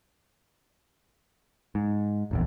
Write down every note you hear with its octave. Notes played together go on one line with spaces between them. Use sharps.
G#2
D1 A#1 E2